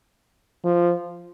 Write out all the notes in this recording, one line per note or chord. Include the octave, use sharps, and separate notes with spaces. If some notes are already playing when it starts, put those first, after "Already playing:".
F3